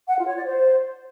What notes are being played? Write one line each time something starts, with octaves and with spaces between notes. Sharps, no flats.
F#5
F4
C#5
D5
C5